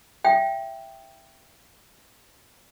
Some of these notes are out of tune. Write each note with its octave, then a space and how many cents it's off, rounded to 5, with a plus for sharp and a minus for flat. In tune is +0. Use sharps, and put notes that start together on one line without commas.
E5 +15 G5 +0